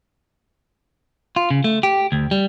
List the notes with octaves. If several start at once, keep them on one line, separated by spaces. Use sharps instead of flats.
F4
C#3
A3
G4
D2
G3